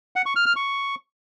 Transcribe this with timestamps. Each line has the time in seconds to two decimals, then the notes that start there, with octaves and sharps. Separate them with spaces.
0.16 F#5
0.26 C#6
0.36 F6
0.46 F6
0.56 C#6